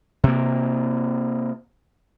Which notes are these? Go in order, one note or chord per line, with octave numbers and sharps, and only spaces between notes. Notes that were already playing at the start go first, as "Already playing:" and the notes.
C3 A#3